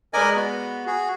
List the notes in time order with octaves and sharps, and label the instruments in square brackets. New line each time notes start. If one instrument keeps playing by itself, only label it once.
[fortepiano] G#3 B4 D5 [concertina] A#4 D#5 G#5
[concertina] B3 F#4
F#4 G#4